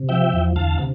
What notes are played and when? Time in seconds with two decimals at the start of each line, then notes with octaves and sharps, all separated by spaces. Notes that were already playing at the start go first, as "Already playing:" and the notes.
Already playing: C3
0.09 F3 E5 G5
0.33 E2
0.56 D2 F5 A5
0.79 C3